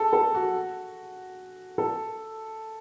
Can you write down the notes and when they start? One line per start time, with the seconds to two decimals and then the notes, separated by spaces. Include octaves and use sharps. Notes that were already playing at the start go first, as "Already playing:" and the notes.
Already playing: G#4 A4
0.13 A4
0.35 F#4
1.78 A4